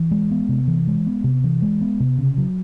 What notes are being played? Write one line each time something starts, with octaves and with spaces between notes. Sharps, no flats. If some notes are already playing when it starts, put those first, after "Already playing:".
Already playing: E3
G#3
B3
C3
E3
G#3
B3
C3
E3
G#3
B3
C3
C#3
F#3